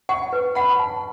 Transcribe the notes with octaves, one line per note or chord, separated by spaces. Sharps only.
F#5 C#6
B4
F#5 B5
A5